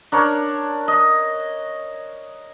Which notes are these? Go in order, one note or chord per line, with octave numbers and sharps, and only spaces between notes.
D4 A#4 C#5
D#5